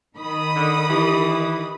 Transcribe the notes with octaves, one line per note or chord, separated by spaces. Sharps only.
D#3 B5 D#6
D3
E3 G4